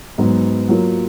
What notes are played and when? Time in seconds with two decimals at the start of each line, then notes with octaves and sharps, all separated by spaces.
0.18 G#2 F#3 B3
0.69 F#3 A#3 F4